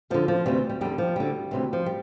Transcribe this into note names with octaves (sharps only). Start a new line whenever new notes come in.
E2 D3 F3
F3
D2 C3 E3 G3
G3
E2 D3 G3
F3
D2 D3 G3
D2 C3 E3
F3
G3